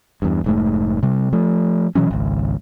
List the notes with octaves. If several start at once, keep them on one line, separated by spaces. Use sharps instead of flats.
E2 G2
F1 G#2 A3
C3 G3
F3 A3
B2 E3 F#3 C#4
G#1 C#2